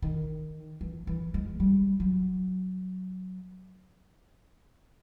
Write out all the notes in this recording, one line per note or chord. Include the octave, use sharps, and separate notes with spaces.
D#3
E3
E3
G#3
G3
F#3